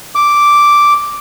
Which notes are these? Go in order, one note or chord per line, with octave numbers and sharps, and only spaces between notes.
D6